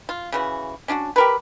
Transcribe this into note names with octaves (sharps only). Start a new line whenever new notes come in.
F4
C#3 E3 F#4
C#4 D4 F4 F#4
G4 A#4 B4